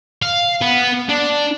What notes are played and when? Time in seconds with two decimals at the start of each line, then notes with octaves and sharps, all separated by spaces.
0.22 F5
0.61 B3
1.09 D4